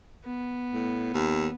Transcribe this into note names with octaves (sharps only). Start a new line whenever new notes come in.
B3
A2
D#2